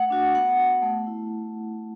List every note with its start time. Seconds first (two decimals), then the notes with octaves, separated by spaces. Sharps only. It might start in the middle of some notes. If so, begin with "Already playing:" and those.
Already playing: A3 F#5
0.10 D4 F#4
0.35 B3 F#5
0.59 F#4
0.82 A3
1.07 E4